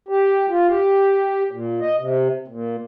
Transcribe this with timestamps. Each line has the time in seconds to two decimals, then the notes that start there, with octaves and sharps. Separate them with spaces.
0.09 G4
0.49 F4
0.68 G4
1.51 A#2
1.80 D#5
1.98 C3
2.48 A#2